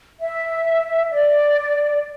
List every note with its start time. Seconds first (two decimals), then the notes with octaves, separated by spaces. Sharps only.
0.20 E5
1.13 D5